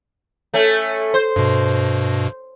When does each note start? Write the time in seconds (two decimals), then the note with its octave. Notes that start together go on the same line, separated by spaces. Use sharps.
0.54 A3 C#4
1.14 C5
1.36 G2 B2